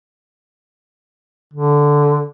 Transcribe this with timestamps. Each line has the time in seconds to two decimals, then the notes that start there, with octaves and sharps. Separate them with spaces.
1.53 D3